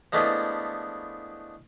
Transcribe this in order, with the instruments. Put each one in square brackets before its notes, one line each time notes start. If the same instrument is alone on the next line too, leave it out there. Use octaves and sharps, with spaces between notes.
[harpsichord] F3 G#3 A3 B3 D4 E4